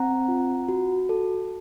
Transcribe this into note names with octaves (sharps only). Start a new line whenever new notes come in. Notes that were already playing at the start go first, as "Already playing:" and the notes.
Already playing: C4 F#5 A#5
F4
F#4
A4